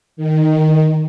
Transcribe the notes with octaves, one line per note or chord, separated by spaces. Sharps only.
D#3